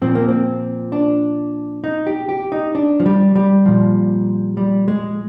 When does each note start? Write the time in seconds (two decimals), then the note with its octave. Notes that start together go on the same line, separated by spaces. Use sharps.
0.02 A#2 F3 C4
0.15 A#3
0.29 C4
0.92 D4
1.84 D#4
2.07 G4
2.29 G4
2.52 D#4
2.75 D4
3.00 F3
3.06 G3
3.35 G3
3.65 A#2 F3
4.57 G3
4.88 G#3